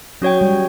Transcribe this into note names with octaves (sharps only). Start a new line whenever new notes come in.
F#3 C#4 F#4 C#5 G5
G3